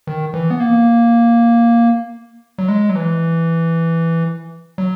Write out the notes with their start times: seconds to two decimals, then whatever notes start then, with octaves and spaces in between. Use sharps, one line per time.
0.07 D#3
0.34 E3
0.50 B3
0.60 A#3
2.58 F#3
2.68 G#3
2.89 F#3
2.95 E3
4.78 F#3